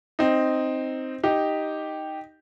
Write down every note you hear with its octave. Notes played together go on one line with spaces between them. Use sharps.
C4 D#4
D#4 G4